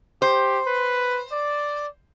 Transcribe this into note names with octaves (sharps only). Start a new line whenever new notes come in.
G4 C5
B4
D5